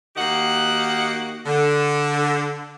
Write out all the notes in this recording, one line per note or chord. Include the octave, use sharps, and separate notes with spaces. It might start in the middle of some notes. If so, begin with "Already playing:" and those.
D#3 A#3 F#4 G4 D#5 F#5
D3